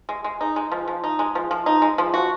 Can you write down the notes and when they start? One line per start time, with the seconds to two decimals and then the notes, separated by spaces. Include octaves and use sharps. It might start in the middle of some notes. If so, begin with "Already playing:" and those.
0.09 G#3
0.24 G#3
0.41 D#4
0.56 G#3
0.72 F3
0.88 F3
1.04 D#4
1.19 G#3
1.35 F3
1.51 F3
1.66 D#4
1.82 G#3
1.98 F3
2.14 F#4